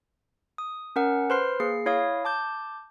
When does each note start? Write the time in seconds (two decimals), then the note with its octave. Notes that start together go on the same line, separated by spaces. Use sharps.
0.58 D#6
0.96 C#4 A#4 F#5
1.30 B4 C5 C6 F6 C7
1.60 A#3 G#4 C7
1.86 E4 C#5 F5 D#6
2.25 A5 D6 G6